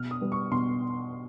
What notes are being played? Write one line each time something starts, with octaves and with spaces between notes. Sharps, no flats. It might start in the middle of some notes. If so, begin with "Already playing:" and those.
Already playing: B2 F6
D#6
G3 B3
C#6
B2 C6